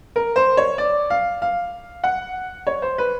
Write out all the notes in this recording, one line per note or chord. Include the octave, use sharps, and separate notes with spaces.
A#4
C5
C#5
D5
F5
F5
F#5
C#5
C5
B4